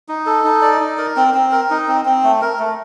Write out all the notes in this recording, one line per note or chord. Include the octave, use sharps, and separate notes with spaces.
D#4
A4
D#4
D5
D#4
A#4
C4
C4
A#4
D#4
C4
C4
A3
A#4
A3